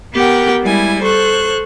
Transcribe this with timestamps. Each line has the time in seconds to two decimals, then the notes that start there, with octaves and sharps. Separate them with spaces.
0.14 B3 G4 A#4 F#5 G5
0.63 G3 G#3 E4 G#5
1.02 A4 C5 C#6 F#6